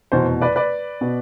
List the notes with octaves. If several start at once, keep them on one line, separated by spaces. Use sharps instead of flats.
F1 E2 B2 C5
B4 D5
B4 D5
B2 B3